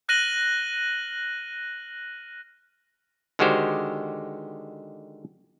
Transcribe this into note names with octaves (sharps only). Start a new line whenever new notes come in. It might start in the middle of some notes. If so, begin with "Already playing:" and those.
F6 F#6 A#6 D#7 F#7 G7
D3 D#3 G#3 F#4 G4 C5